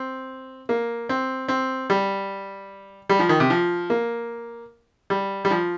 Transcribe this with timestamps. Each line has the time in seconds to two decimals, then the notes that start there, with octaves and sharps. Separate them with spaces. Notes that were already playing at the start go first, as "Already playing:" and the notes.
Already playing: C4
0.69 A#3
1.09 C4
1.48 C4
1.90 G3
3.09 G3
3.19 F3
3.29 D#3
3.40 C3
3.50 F3
3.90 A#3
5.10 G3
5.45 G3
5.51 F3